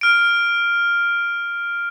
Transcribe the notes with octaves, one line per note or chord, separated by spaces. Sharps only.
F6 D7